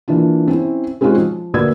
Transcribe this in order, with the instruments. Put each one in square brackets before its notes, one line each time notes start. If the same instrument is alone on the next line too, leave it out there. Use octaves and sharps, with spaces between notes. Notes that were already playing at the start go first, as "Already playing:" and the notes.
[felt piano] E3 A#3 D4 F4
C4 C#4 E4
G#3 C4 C#4 D#4 F4 F#4
F3
D2 A#3 B4 D5 E6 G#6